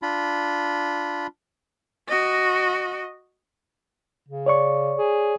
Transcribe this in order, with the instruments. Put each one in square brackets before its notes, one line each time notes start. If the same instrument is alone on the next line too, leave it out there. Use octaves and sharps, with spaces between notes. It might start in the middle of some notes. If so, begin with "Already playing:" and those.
[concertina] D4 F4 B5
[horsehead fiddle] F#4 D#5
[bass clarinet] C#3
[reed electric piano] C#5 D5 C#6
[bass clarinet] G#4